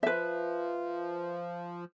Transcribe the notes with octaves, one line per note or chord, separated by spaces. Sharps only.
F3 B4 E5